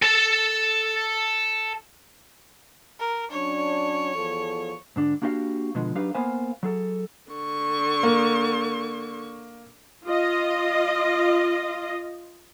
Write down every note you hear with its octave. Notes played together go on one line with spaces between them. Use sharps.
A4 A5
A#4
F#3 C#4 D4 C#5
E2 F3 A4
G#2 D3 D4
A#3 D4 F#4 G4 D#5 F5
B2 D3 F3 G#3
F#3 D4 D#4 G4 B4 F5
A#3 B3 A#4 C5 F5 G#5
F#3 G#4 A4
D3 C#6
A#3
F4 D#5